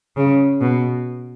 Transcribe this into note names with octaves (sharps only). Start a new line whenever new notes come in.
C#3
B2